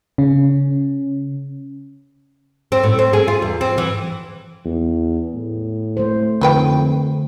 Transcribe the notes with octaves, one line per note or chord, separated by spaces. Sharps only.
C#3 C#4
C4
A2
C4
G#4
F4
E2
C4
E3
E2
A2
A3 C5
F2 D3 D#3 B4 G5